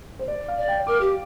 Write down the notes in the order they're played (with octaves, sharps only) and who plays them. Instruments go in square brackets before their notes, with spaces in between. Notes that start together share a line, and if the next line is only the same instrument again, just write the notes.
[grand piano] C5
D5
F5
[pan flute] D5
[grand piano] G5
[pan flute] A#4 [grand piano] D6
[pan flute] G4